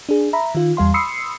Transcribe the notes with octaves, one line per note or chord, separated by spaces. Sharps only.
D4 G#4
E5 A#5 B5
D#3 F4
E2 G3 F5 C6
B5 C6 D#6 E6 C7 C#7